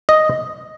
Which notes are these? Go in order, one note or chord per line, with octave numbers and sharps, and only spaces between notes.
D#5